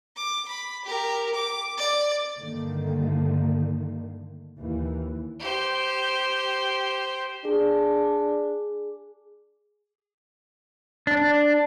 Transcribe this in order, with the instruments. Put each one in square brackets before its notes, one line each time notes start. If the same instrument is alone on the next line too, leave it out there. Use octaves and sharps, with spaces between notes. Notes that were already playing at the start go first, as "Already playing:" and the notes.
[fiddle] D6
B5
G4 A#4
D6
D5
[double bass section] G2 D3 D#3 A3 A#3
D#2 E3
[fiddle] G4 C5
[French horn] D4 [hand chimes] G#4
[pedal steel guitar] D4